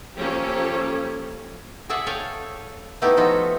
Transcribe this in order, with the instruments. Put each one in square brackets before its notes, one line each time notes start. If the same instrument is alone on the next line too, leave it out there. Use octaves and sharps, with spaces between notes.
[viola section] F3 A#3 C#4 G4 A4
[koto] G#4 A4 D5 E5 F#5 G#5
A4 C#5 F5 G5 G#5
A3 B3 D#4 E4 G4 A4
F3 F4 F#4 D#5 E5